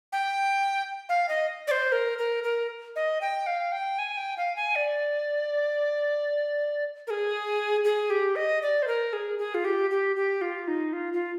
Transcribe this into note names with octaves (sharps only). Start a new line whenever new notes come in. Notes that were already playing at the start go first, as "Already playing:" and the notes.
G5
F5
D#5
D5
C5
A#4
A#4
A#4
D#5
G5
F5
G5
G#5
G5
F5
G#5
D5
A#4
G#4
G#4
G4
D#5
D5
C5
A#4
G#4
G#4
F4
G4
G4
G4
F4
D#4
F4
F4